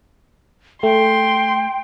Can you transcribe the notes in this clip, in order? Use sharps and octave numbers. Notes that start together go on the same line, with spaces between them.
A3 G5 C6